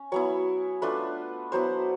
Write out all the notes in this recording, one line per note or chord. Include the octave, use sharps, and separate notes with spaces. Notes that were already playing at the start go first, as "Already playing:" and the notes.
Already playing: C#4
F#3 B3 E4 C#5
A3 D4 F4 B4
F#3 B3 E4 C5